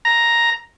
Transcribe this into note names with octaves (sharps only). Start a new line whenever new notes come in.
A#5